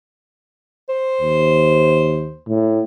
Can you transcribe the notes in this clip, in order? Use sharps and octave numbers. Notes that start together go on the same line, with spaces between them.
C5
D#2
A2